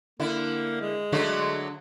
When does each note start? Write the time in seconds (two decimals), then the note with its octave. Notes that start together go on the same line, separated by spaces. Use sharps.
0.20 D3 A#3 E4
0.81 G#3
1.12 D3 F#3 A3